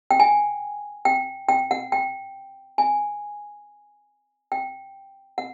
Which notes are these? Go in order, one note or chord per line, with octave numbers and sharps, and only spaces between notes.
G5
G#5
G5
G5
F#5
G5
G#5
G5
F#5